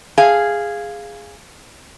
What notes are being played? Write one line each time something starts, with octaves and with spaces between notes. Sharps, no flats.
G#4 F5